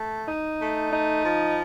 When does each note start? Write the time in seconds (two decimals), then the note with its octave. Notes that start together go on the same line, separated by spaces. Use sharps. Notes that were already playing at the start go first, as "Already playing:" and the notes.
Already playing: A3
0.25 D#4
0.59 A3
0.92 D#4
1.24 F3